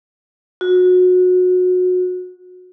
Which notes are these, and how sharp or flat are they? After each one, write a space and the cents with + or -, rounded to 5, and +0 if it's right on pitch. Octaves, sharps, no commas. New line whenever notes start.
F#4 -25